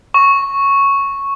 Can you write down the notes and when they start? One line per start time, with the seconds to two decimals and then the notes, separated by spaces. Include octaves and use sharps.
0.14 C#6